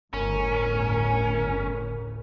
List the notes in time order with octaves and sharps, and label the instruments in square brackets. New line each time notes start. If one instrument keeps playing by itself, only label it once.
[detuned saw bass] G1 [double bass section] D2 A2 C#3 [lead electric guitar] C#4 [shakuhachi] A#4